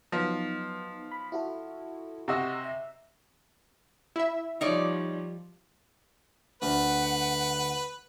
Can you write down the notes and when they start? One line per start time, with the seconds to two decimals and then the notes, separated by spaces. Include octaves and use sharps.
0.12 F3 F#3 B3 D#4
1.12 B5
1.32 E4 F#4 A4
2.28 C3 F#4 D#5 A#5 E6
2.64 E5
4.16 E4 E5
4.61 F3 G3 D#4 C#5 D5
6.62 D2 B4 F#5